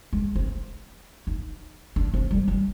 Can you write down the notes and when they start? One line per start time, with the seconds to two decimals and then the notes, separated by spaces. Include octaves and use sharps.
0.13 G#3
0.36 C4
1.27 D#4
1.96 D4
2.14 C4
2.31 G3
2.48 G3